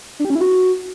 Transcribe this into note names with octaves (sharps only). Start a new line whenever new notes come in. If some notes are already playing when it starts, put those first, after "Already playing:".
D4
G4
C#4
E4
F#4